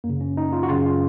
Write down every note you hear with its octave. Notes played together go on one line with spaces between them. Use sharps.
F#2 A#3
C#3
C#4
D#4
F4
F#4
F#2 C#3 F4
F4